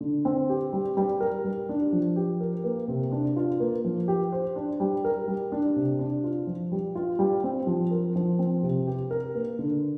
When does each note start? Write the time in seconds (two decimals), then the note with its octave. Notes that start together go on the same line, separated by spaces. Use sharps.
0.01 D3
0.25 C4
0.49 G4
0.73 G3
0.97 G3
1.20 A#4
1.44 G3
1.69 D4
1.93 F3
2.16 G4
2.40 A#4
2.64 A#3
2.88 C3
3.12 D4
3.36 F4
3.60 A#3
3.84 F3
4.08 G4
4.32 C5
4.56 D4
4.80 G3
5.04 A#4
5.28 G3
5.52 D4
5.76 C3
5.99 D4
6.24 F4
6.47 F3
6.72 G3
6.95 F4
7.19 G3
7.44 C4
7.67 F3
7.91 A#4
8.16 F3
8.39 C4
8.63 C3
8.87 G4
9.11 A#4
9.35 A#3
9.59 D3